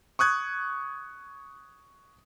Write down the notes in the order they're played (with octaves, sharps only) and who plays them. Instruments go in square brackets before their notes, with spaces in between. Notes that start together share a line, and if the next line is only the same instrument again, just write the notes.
[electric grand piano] C#6 D#6 F#6 G#6